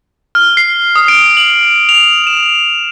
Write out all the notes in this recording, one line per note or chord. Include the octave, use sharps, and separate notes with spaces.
F6
C7
D#6
D7
F#7
F7
E7